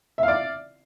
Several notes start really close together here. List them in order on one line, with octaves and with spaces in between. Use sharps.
E5 F5 D5